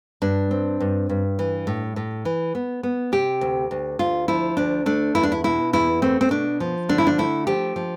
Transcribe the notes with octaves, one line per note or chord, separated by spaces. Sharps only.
G2 D4
C4
G2
G2
E3
A2
A2
E3
B3
B3
C3 G4
D2
D2
D2 F4
F3 E4
D2 D4
A3 D4
E2 E4
D4
E4
B2 E4
E2 E4
A3 C4
C4
B2 D4
F3
D3 D4
E4
D4
A3 E4
F3 G4
F3